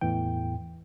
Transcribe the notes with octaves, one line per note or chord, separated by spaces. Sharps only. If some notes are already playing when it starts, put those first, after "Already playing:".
E2 A2 E3 G5